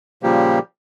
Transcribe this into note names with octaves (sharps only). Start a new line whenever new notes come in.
A#2 C#3 F3 G3 A#3 G4